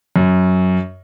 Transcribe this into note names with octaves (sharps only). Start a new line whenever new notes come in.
F#2